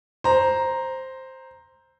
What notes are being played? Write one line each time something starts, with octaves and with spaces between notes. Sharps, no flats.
C5 A#5